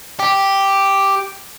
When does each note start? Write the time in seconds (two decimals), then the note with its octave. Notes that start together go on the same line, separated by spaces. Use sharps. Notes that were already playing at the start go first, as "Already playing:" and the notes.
0.19 G4